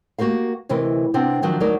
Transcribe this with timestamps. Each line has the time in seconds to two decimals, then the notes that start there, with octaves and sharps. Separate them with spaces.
0.18 A#3 F#4 G4 A#4 F5
0.69 D2 C3 E3 A#4 B4 D#5
1.14 C3 B3 C4 D4
1.42 D#3 F3 F#3 D4 F#4
1.60 D2 F#3 D#4 A#4 D5